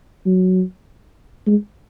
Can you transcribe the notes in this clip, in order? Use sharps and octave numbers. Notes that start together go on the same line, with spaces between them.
F#3
G#3